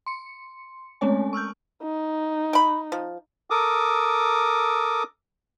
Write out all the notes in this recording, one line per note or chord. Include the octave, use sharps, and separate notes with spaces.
C6 C#7
G#3 A3 C4 C#4 C#5 G#5
C#6 E6 F6 G6
D#4
G5 B5
F3
A4 A#4 D6 D#6